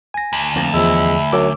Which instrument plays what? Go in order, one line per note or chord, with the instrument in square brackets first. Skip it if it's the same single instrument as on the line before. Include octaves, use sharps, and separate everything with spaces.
[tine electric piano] G#5 A#6
[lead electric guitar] D2
[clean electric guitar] F2 F3 A#3
[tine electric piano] E2 F3 [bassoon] G#3 [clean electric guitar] E4
[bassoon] F#2 [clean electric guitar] F#3 [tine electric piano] D6 E6